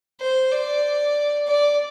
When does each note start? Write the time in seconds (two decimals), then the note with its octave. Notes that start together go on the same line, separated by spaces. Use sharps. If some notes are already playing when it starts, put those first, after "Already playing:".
0.20 C5
0.52 D5
1.47 D5